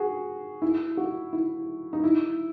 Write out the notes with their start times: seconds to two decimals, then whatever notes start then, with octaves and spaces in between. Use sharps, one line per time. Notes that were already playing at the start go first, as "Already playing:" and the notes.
Already playing: F#4 G#4
0.62 E4
0.97 F#4
1.33 E4
1.93 D#4
2.04 E4